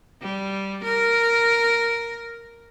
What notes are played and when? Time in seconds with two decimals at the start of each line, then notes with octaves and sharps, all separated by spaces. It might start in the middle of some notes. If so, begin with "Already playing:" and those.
0.22 G3
0.84 A#4